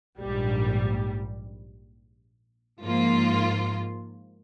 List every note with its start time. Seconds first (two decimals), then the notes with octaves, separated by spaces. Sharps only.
0.19 A#1 G#2 G3
2.82 G#2 F3 A#3 F4